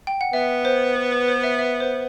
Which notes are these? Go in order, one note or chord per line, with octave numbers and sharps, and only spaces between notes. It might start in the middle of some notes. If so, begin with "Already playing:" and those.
G5
F#5
B3 E5
C5
B4
B4
C5
E5
E5
C5